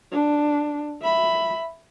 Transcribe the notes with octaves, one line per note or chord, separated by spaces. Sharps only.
D4
E5 B5